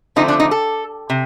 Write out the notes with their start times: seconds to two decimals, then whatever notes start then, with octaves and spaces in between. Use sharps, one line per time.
0.16 D3 F3 A3 C4 D#4
0.28 D4
0.40 D#4
0.51 A4
1.10 C3